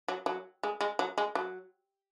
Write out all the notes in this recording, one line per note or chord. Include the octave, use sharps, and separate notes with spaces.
F#3
F#3
G#3
G#3
F#3
G#3
F#3